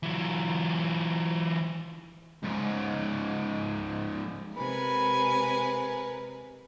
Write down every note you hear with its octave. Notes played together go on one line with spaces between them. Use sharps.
E3 F#3
C#2 G#2
C3 G#3 A#4 B4 G#5 B5